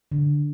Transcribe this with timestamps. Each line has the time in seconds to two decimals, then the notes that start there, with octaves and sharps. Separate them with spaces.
0.12 D3